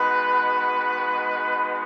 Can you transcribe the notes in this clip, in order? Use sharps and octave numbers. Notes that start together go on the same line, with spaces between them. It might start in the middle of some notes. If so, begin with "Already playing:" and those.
Already playing: G#3 B3 D#4 F#4 B4